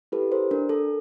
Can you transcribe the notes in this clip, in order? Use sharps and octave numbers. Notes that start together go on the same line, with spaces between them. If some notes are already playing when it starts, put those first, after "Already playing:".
E4 G4 A4 B4
A#4 C5
D4 A#4
A4